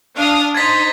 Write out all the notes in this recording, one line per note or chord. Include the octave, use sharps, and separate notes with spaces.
D4 F5 D#6
D#4 C5 G#6 A6 B6